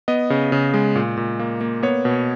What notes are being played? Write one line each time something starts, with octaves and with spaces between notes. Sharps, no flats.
B3 D#5
C#3
C#3
G#3
A#2
A#2
A#3
A#3
B3 C#5
B2